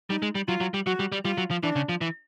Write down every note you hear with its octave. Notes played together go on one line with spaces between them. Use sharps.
G3 D#4
G#3
G3
F#3 F4
F#3
G3
F#3 F#4
G3
G3
G3 F4
F#3
F3
E3 D4
C#3
F3
E3